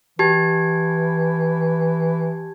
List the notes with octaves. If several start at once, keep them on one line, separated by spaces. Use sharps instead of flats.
E3 G4 A5 G#6